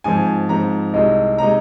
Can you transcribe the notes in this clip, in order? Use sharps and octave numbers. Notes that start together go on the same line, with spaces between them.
G#2 F3 C4 G#5
G#2 F3 C4 A#5
C2 C3 G#3 D#4
C3 G#3 D#4 A#5